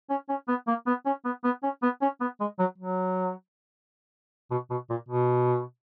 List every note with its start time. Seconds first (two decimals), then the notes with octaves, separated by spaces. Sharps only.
0.10 C#4
0.29 C#4
0.48 B3
0.67 A#3
0.87 B3
1.06 C#4
1.25 B3
1.44 B3
1.63 C#4
1.82 B3
2.02 C#4
2.21 B3
2.40 G#3
2.59 F#3
2.78 F#3
4.51 B2
4.70 B2
4.90 A#2
5.09 B2